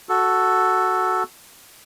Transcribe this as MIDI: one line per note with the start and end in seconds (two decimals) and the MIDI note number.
0.09 1.23 66
0.09 1.23 69